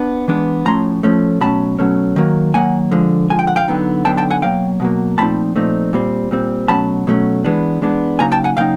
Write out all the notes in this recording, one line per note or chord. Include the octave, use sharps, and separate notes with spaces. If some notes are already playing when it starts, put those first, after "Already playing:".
Already playing: B3 D4
E3 G#3 B3 D4
A2 F3 A3 C#4 A#5 C6
A2 F3 A3 C#4
B2 F#3 A3 C#4 A5 B5
B2 F#3 A3 C#4
D#3 F#3 A#3
D#3 F#3 A#3 F#5 G#5
D3 F3 G#3
D3 F3 G#3 G#5
G5
F#5
F5 G5
D3 F#3 B3 D#4
D3 F#3 B3 D#4 G5 A5
G5 A5
F#5 G#5
B2 F#3 A#3 F5 G5
B2 F#3 A#3
A#2 F3 A3 C4 D#4 A5 B5
A#2 F3 A3 C4 D#4
A#2 G3 C4
A#2 G3 C4
B2 F#3 A3 C#4 A5 B5
B2 F#3 A3 C#4
E3 G#3 B3 D4
E3 G#3 B3 D4
C#3 F#3 A#3 D#4 G#5 A#5
G5 A5
F#5 G#5
C#3 F#3 A#3 D#4 F5 G5